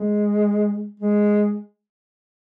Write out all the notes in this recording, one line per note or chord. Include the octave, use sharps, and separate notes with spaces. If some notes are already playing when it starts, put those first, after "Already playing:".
Already playing: G#3
G#3